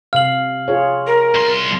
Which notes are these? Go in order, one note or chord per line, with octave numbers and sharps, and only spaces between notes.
C3 F5 F6 F#7
F4 G#4 C#5
A#4
C2 C6